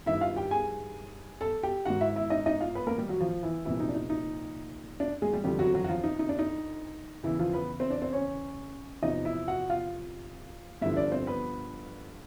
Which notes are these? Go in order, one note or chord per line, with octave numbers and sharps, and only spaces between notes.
G2 D#3 E4 E5
F4 F5
G4 G5
G#4 G#5
A4 A5
G4 G5
G#2 D#3 F#4 F#5
E4 E5
E4 E5
D#4 D#5
D#4 D#5
F4 F5
B3 B4
A#3 A#4
G3 G4
F#3 F#4
F3 F4
E3 E4
C2 A#2 E3 F3 E4
D#4
D4
D#4
D#4
D4
G#3 G#4
G3 G4
F2 D3 F3 G3 G4
F#3 F#4
F#3 F#4
F#4
F3 F4
D#4
D#4
D4
D#4
E2 C#3 E3 E4
F3 F4
B3 B4
C4 C5
D4 D5
C4 C5
C#4 C#5
E2 C3 F3 D#4 D#5
E4 E5
F#4 F#5
F4 F5
G2 D3 F3 E4 E5
D4 D5
C4 C5
B3 B4